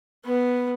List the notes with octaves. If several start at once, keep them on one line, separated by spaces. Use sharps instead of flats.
B3